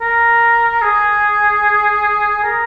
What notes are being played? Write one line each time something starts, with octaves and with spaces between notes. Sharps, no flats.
A#4
G#4
A#4